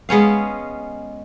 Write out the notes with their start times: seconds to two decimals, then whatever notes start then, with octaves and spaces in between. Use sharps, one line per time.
0.09 G#3 B3 C#4 F5